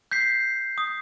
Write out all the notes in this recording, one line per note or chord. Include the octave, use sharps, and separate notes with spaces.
G6 B6 C7
D#6